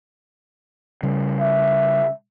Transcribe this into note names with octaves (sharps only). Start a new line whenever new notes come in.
C#3 G3
E5